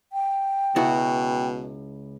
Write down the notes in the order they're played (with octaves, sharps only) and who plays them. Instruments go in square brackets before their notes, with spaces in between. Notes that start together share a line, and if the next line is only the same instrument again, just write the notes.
[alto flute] G5
[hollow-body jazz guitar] C#2 E4 F#4 [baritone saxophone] B2